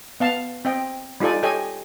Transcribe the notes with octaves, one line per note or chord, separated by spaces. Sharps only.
B3 F5 A5
C4 D#5 G5
G3 D#4 F4 A4 D5 G#5
G4 A4 C#5 D#5 G#5